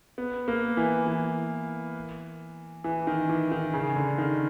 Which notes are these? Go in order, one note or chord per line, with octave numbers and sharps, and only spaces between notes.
B3
A#3
E3
E3
E3
D#3
E3
D#3
C#3
D3
D#3